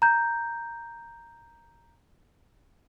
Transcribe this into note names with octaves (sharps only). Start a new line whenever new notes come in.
A#5 G6